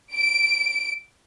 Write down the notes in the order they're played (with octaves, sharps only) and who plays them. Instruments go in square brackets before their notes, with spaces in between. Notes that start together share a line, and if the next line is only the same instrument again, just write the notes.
[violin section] D7